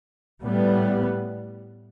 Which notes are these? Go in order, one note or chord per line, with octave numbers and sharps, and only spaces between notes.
A2 G3 B3